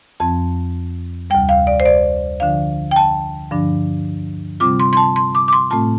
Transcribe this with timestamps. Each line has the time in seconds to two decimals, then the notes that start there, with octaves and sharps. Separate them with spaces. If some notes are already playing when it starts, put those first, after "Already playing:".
0.20 F2 F3 C4 A5
1.30 D2 C3 G3 G5
1.49 F5
1.67 D5
1.80 C5
1.85 D5
2.40 D3 F3 D4 F4 F5
2.91 G5
2.96 A5
3.51 G2 D3 F3 D4
4.60 C3 G3 C4 F4 D6
4.80 C6
4.93 C6
4.97 A5
5.16 C6
5.35 D6
5.48 D6
5.53 C6
5.70 A2 A3 C4 F4 A5